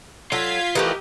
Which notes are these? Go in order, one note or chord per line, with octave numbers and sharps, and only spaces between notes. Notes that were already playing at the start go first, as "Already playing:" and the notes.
F#3 F4 A4 G#6 B6 C7
E3 F3 A3 G4 A#4 D#5